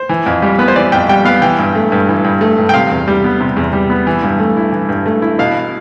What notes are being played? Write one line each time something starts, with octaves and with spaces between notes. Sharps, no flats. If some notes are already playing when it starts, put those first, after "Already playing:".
Already playing: C5
E3
F2
G3
B3 B4
C5
E3 D5
F2 G5
G3 G5
B3 F5
E3 G5
G2
A3
G2
E3
G2
A3
G2
G5
C3 F5
E2
G3
B3
C3
E2
G3
B3
E3
G2
A3
E4
E3
G2
A3
E4
B2 F5